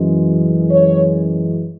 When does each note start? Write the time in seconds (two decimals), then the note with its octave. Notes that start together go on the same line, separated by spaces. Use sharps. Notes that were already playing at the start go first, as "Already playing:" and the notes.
Already playing: F#2 E3 G#3
0.70 C#5